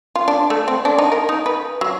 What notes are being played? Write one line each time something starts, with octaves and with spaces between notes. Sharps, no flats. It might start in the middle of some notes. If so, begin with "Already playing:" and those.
F4
D4
A3
C4
D4
D#4
A#4
D#4
B4
F#3